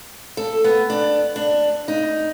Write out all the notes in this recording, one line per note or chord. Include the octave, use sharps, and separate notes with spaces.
A4
B3
D4
D4
D#4